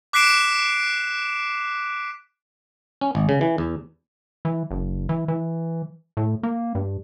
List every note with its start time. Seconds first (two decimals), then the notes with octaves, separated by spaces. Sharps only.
0.13 D6 F#6 B6 C7 D7 E7
3.01 C#4
3.15 G#1
3.29 C#3
3.41 E3
3.58 E2
4.45 E3
4.71 F#1
5.09 E3
5.28 E3
6.17 A2
6.43 A#3
6.75 G2